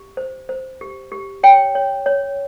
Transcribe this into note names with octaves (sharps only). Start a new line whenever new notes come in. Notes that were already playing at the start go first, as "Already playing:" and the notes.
Already playing: G4
C5
C5
G4
G4
C#5 G5
C#5
C#5